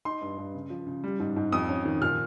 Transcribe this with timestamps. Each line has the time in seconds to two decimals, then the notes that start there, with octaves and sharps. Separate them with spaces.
0.05 D#4 C6
0.22 G2
0.38 G2
0.55 C#3
0.70 F3
0.87 C#3
1.04 G3
1.20 G#2
1.36 G#2
1.52 F2 D#6
1.69 C#4
1.85 D#3
2.01 A#2 F6